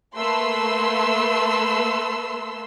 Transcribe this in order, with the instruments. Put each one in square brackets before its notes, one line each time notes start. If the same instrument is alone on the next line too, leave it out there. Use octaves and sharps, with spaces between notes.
[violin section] A3 A#3 B4 C6 E6